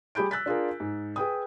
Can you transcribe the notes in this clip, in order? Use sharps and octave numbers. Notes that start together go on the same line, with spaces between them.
G3 G4 G#4 B5 G6 D7
E6 F#6 A6 B6
D4 F4 G#4 A#4
G#2
G#4 B4 G5 D#6